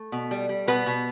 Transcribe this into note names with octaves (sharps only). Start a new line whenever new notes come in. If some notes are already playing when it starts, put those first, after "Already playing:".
Already playing: A3
B2
G3
G3
B2 B3 B4
B2